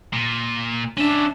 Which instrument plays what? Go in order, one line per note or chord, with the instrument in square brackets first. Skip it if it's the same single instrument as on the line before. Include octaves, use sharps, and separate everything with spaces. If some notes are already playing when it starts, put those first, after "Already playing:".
[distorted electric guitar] A#2
[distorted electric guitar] C#4 E5 [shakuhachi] D4